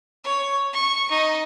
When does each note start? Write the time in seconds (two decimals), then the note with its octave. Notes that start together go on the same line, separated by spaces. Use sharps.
0.24 C#5
0.73 C#6
1.11 D#4